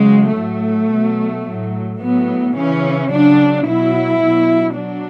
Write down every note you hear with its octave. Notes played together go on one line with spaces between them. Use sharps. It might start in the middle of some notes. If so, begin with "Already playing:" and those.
Already playing: C#3 F#3 G#3
A2 F#3 A3
B2
F#3
A2 F#3
A2 F#3 B3
C#3 E3 C#4
C#3 F#3 D4
B2 F#3 E4
B2 F#3
F#3 D4